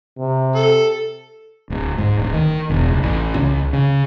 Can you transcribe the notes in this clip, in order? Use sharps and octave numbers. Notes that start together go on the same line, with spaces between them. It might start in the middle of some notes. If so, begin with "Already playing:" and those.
C3
A4
D1
G#2
D1
D#3
E1
C#2
A1
C#2
C#3